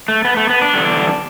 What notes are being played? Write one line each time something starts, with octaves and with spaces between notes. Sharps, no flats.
A3
B3
A3
B3
D4
E2 D3 G3